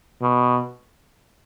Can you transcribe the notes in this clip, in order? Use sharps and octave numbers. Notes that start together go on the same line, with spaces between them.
B2